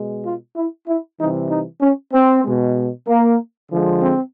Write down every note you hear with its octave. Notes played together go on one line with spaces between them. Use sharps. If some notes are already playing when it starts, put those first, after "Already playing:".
Already playing: B2 G#3
F4
E4
E4
C3 E3 G3 D#4
D#4
C#4
C4
B2 G#3
A#3
D3 F3 G#3
C4